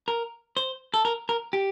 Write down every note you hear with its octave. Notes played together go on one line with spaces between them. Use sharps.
A#4
C5
A4
A#4
A#4
G4